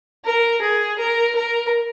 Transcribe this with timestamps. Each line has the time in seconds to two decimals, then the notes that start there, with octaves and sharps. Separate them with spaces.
0.24 A#4
0.61 G#4
0.98 A#4
1.35 A#4